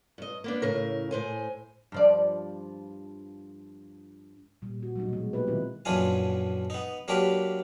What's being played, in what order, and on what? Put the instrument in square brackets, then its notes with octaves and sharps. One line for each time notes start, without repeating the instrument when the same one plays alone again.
[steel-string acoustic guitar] G2 D#5
A#3 B3 D4
A2 C#3 A#4
A2 C5 G#5
[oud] G2 F3 D5
[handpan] A#2 G3
G3 F#4
F#3 G3 A3 D#4
B2 E3 G#3
G#3 A#3 D#4 G4 B4
D#3 F#3 G#3 C4 E4 F4
[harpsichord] A#1 F#2 E3 D4 F4 G#5
B3 D#4
F#3 A#3 D4 G4 A#4 B4